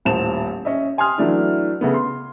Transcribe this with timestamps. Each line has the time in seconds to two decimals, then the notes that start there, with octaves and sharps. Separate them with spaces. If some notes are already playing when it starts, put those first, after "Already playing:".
0.05 D#1 A1 C5 A5 E7 F7
0.65 C#4 D#5 E5
0.98 G4 G#5 C6 D#6 F6
1.18 E3 F#3 A3 D4 E4
1.81 C#3 A3 B3
1.94 C6